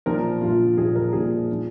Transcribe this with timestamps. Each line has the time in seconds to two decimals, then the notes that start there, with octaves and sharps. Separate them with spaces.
0.06 A#1 A#2 F3 A#4
0.41 A#1 A#2 F3 F4
0.77 A#1 A#2 F3 G#4
0.95 A#4
1.13 A#1 A#2 F3 G#4
1.52 F3